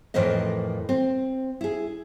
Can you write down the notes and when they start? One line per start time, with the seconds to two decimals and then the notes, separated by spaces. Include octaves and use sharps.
0.14 F2 A2 E3 A#4 C5 D#5
0.89 C4
1.61 E4 G#4